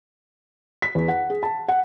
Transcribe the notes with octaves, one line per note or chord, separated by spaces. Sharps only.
B6
E2
F#5
G#4
A5
F#5